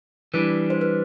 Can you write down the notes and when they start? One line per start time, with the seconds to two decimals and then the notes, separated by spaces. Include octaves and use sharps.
0.34 E3 G3 D4 B4
0.70 C5
0.81 B4